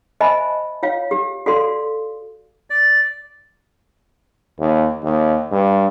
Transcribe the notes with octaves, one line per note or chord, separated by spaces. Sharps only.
C5 D#5 E5 G#5 A5 B5
F4 C#5 F5
G4
F#4 A4 D5 F5 C6
D5
D#2
D#2
G2